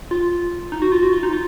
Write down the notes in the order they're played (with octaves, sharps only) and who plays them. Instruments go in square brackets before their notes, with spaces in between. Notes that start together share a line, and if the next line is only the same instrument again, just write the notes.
[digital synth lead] F4
D#4
F#4
F4
F#4
F4
D#4
F4